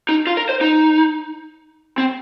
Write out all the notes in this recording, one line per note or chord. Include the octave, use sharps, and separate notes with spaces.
D#4
F4
A#4
C5
D#4
C4